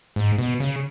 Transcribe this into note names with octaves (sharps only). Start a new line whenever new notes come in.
G#2
B2
C#3